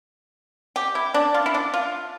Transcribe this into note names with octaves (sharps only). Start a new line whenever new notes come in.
G4
E4
D4
F4
E4
D4
F4